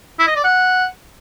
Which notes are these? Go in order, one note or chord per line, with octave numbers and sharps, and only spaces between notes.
E4
D#5
D5
F#5